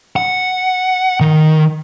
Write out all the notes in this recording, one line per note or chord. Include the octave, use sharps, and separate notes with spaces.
F#5
D#3